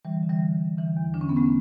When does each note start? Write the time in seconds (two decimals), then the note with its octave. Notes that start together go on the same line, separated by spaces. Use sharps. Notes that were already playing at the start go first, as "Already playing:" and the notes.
0.05 D3 E3 G3
0.23 D3
0.29 E3 G3
0.42 D3
0.60 D3
0.77 D3 E3
0.97 E2
1.14 D3 D4
1.21 C#4
1.29 B3
1.32 E2 A3 C#4